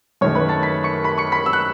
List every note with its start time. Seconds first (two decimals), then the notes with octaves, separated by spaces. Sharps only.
0.21 F#2 D#3 A3 C#5 C#6
0.35 B4 B5
0.49 A5 A6
0.63 B5 B6
0.84 C#6 C#7
1.04 B5 B6
1.18 C#6 C#7
1.32 B5 B6
1.46 E6
1.53 F#6